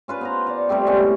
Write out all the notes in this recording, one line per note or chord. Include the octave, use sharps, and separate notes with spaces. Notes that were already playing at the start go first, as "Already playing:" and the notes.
C#4 F4 B4 C5
B3 C5 A#5
D5 F5
G3 A3 C4 G4
C3 G#3 B3 C#4
A2